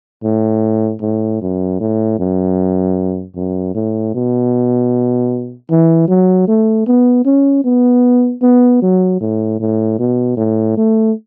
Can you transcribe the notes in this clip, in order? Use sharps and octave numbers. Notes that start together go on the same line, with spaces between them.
A2
A2
F#2
A2
F#2
F#2
A2
B2
E3
F#3
A3
B3
C#4
B3
B3
F#3
A2
A2
B2
A2
A3